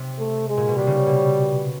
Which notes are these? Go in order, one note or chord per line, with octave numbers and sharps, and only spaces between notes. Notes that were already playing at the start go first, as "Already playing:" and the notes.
Already playing: C3
A3
G#3
A#2
B2
C3 G3
C#3
B2